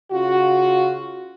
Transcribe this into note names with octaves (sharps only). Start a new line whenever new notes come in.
C#3 F4 F#4